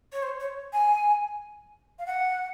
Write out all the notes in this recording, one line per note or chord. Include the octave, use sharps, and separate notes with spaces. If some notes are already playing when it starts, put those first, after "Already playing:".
C#5
C5
C#5
G#5
F5
F#5